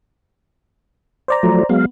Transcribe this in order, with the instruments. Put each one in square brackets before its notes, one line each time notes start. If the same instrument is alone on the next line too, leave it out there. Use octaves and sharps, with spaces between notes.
[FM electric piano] C5 D5 A#5
[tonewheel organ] F3 F#3 A3
[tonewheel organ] F#3 G#3 F5 [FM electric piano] B3